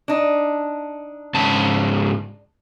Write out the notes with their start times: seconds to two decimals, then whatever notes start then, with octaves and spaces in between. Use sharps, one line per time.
0.08 D4 D#4
1.34 G#2 C#3 A5